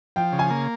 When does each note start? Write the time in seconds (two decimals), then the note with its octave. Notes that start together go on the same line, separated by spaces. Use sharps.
0.16 F3 G5
0.33 C#3
0.39 G#5
0.50 A#3